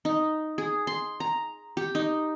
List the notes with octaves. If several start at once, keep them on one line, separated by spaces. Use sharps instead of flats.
D#4
G#4
C6
A#5
G4
D#4